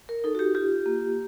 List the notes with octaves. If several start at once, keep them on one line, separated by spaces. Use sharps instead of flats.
A#4
D#4 A4
F#4
G4
F4 G4
A#3